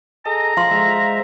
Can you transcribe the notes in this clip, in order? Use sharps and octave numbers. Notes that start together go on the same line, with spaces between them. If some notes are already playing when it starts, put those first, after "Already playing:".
G#4 A4 D#5 A#5
F3 F5 C6
G#3 C5 E5